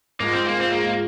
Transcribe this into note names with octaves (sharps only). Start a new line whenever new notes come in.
G#2 G#3 A#3 F4
C4
A#3
C4
A#3